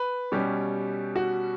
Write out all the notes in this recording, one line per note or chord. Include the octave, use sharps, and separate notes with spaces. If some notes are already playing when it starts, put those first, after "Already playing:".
Already playing: B4
B2 G3 C#4 G4
F#4